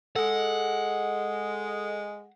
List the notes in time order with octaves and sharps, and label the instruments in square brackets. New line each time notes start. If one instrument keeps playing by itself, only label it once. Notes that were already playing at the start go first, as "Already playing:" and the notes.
[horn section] G#3 [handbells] A4 [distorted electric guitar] F#5